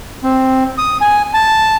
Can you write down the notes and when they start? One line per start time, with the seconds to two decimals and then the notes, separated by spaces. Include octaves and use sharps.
0.23 C4
0.78 D#6
1.01 G#5
1.34 A5